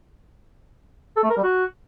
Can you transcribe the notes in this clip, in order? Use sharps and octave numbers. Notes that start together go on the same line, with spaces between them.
A4
A3
A#4
G3
F#4